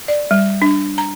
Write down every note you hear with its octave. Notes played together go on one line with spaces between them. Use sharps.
D5
G3
D4
A#5